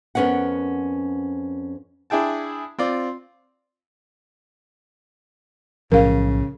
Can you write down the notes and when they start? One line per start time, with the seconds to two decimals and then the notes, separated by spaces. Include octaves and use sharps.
0.15 F2 B3 C#4 A#4 F#5
2.10 D4 E4 G#4 G5 A5
2.79 C4 F4 D5
5.92 B1 A2 C#3 F3 A#4 F5